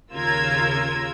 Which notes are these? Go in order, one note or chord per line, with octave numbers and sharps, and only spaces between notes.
D#2 C#3 F4 A#4 E6 G#6